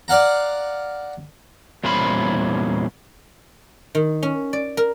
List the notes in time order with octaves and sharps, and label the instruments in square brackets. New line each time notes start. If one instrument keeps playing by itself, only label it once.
[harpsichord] D5 F5 F#5 A#5
[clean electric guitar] E2 A#2 G3 C#4 C5 B5
[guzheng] D#3
C#4
D5
A#4